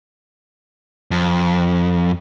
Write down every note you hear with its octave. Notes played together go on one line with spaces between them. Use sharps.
F2